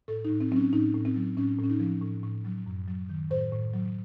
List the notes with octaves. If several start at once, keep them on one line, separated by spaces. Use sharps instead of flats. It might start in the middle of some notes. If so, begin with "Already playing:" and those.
A2 A4
D#4
A2
C4
F#3 C4 C#4
A2 D#4
A2
C4
F#3
A2 C#4
A2
C#4
D#4
F3
A2
A2
F#3
F#2
F#3
D#3
A2 C5
A2
F#3